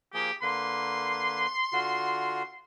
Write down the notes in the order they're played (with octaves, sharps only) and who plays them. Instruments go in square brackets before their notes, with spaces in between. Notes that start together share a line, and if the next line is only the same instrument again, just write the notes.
[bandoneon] F3 A#3 G#4 [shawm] G4
[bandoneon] D3 A#3 B4 [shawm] C6
[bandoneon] D3 F4 F#4